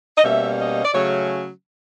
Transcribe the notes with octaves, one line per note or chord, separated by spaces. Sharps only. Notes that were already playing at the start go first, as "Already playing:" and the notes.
D#5
B2 G3 A#3 C#4 E5
D#5
D5
C#3 F#3 A3 C#4 C#5